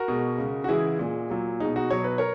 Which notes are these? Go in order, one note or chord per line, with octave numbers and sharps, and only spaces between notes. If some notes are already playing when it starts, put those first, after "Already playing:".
Already playing: F#4 A#4
B2 G#3
C#3 G#3
F#4
C#3 E3 G#3 E4 G#4
A#2 G#3
A#2 F#3
B2 G#3 D#4
D#4 F#4
B2 F#3 C#5
B4
A#4 C#5